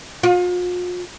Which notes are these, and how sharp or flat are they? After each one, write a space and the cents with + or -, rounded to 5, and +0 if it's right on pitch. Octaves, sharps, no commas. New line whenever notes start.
F4 +40